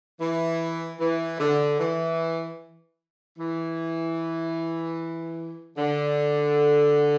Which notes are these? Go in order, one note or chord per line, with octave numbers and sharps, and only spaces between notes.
E3
E3
D3
E3
E3
D3